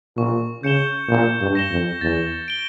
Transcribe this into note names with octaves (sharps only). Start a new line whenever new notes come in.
A#2 C#6
C#3 G6 C#7 E7 G7
A#2 G6
G2
A#6 E7 G7
F2
E2 A6
D7 G7